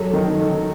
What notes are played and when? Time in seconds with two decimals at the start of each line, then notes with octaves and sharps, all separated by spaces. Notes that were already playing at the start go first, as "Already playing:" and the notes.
Already playing: F#3 A4
0.13 D#3
0.38 D#3